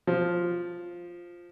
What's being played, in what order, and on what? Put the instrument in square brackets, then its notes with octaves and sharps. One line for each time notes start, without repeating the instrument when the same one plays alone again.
[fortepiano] F3